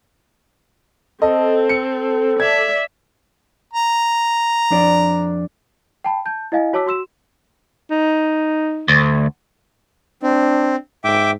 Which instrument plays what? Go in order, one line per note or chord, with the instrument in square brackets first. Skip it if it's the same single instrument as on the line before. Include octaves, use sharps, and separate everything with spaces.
[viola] C4 [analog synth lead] A4 [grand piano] D#5
[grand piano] C#7
[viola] D5 E5 [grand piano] G#6
[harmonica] A#5
[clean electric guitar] F2 D4 D5
[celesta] G5 A5 B5
A5 G6
E4 D#5 F5 G#5
F#4 C#5 A5 D6 E6 B6
F#4 C6 E6 E7
[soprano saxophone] D#4
[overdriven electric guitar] D2
[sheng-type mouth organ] C4 [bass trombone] D4
[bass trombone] G#2 [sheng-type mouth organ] E5 G5 D6